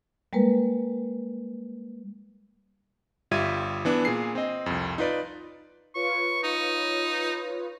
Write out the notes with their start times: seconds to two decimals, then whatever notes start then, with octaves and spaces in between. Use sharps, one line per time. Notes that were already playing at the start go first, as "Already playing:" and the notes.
0.33 G3 G#3 A#3 A#4 B4
3.31 G1 G3 F4 E5 G#6 D#7
3.85 E3 B3 D4
4.05 A#2 G#4 C7
4.35 C4 D#5
4.66 C2 F2
4.98 D#4 F4 B4 D5
5.95 F4 B4 C#5 C#6
6.43 D#4